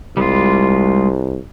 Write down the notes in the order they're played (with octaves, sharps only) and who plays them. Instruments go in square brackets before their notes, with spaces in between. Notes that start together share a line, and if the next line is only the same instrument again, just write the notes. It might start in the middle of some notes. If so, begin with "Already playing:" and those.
[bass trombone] C2 [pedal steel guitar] G3 G#3 F4